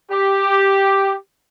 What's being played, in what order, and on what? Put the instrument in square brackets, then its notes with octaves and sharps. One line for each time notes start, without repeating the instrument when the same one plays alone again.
[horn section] G4